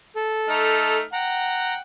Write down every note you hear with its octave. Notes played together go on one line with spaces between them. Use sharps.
A4
A3 D#4 F6
F#5 G5 A#5